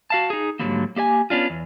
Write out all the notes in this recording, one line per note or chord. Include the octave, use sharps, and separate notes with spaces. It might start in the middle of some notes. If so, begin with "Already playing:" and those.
F#4 F5 A5
D#4 G#4
G#2 D3 D#3 F#3 G3 A#3
A#3 G4 D5 G#5
B3 C#4 D4 F4
E2